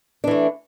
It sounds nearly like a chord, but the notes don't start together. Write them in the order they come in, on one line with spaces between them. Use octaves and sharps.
D4 E3 A3